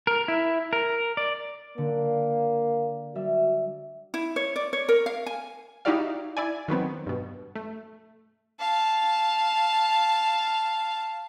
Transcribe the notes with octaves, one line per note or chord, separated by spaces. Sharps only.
A#4
E4
A#4
D5
D3 A#3
G3 F#4 E5
E4
C#5
D5
C#5
A#4
F5
G#5
D#4 E4 F#4 G4 D5 F5
E4 D5 G#5
D#3 F#3 B3 C4
G2 B2
A3
F5 A5